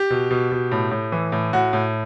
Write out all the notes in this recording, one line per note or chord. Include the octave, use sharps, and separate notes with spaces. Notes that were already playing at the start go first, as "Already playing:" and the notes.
Already playing: G4
B2
B2
B2
A2
A2
E3
A2
A2 F#4
A2